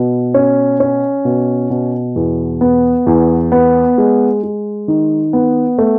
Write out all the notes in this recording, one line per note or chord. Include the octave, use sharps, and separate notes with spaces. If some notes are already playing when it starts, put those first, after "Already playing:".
Already playing: B2
C#4
C#4
B2
B2
E2
B3
E2
B3
G#3
G#3
D#3
B3
A3